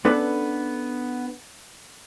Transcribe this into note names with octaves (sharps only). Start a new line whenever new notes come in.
B3 C#4 D4 A4 B4